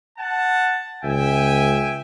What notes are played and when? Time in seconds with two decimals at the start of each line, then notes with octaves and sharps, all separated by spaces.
0.19 F#5 A5
1.03 C#2 E5 G5 G#5